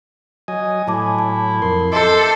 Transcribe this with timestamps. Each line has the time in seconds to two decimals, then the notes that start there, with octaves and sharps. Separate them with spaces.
0.48 F#3 D#5 G#5
0.87 A2 F#3 E4 G#5 A5 D6
1.19 A5
1.62 F2 A#4 C6
1.92 A4 C5 D#5 E5 C6 D6